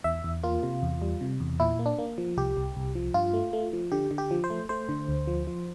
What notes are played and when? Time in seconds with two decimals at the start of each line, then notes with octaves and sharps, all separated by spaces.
0.04 E2 E5
0.24 E2
0.43 A#3 F4
0.63 C3
0.83 E2
1.02 G3
1.21 C3
1.40 E2
1.60 A#2 E4
1.79 A#3
1.86 D4
1.98 A#3
2.18 F3
2.37 C2 G4
2.57 C2
2.76 C2
2.95 F3
3.14 G2 F4
3.34 A3
3.53 A3
3.73 F3
3.92 D3 G4
4.11 D3
4.18 G4
4.31 F3
4.44 C5
4.50 A3
4.69 A3 C5
4.89 D3
5.08 D2
5.27 F3
5.47 F3